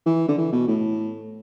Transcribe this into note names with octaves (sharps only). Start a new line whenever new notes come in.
E3
D3
E3
B2
A2